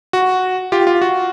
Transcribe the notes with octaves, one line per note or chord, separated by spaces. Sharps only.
F#4
F4 G4
F4
F#4